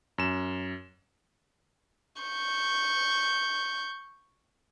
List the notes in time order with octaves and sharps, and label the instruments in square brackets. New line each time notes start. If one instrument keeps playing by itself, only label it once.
[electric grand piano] F#2 E7
[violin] C#6 G6